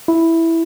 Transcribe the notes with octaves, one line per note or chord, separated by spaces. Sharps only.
E4